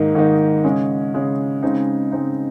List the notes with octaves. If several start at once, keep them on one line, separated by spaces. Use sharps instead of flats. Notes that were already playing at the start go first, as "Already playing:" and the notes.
Already playing: G#2 D#3 A#3 D#4
G#2 D#3 A#3 D#4
C#3 G#3 C#4
C#3 G#3 C#4
C#3 G#3 C4 D#4
C#3 G#3 C4 D#4